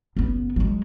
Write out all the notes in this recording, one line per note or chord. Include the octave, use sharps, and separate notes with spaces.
F#1 B3
F#3 G#3